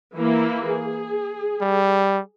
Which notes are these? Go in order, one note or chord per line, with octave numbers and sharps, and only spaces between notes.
E3 A#3 E4
G#4
G3